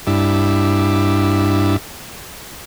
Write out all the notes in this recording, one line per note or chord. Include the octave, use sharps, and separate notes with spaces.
G2 D4 E4